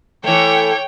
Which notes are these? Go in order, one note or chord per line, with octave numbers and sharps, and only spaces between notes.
E3 A3 C#5 G5